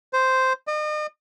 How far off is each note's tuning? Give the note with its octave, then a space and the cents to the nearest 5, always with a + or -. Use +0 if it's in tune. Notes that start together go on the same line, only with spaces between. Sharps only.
C5 -5
D#5 -40